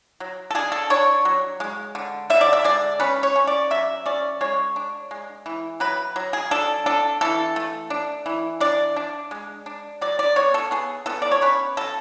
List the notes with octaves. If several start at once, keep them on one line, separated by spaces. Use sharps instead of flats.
F#3
A4
D4 G#4
A4
D4 C#5
F#3
G#3
D3
D3 E5
D5
E5
G#3 D5
C#4 B4
C#5
C#4
D5
F#3 E5
C#4 D5
G#3 C#5
D4
G#3
E3
F#3 B4
F#3
G#4
D4 A4
D4 A4
E3 A4
A3
D4
E3
D4 D5
D4
G#3
D4
F#3 D5
D5
B3 C#5
A4
B3 G#4
B3 A4
D5
C#5
C#4 B4
F#3 A4